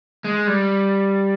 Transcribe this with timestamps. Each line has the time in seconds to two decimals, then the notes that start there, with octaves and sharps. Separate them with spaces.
0.24 G#3
0.47 G3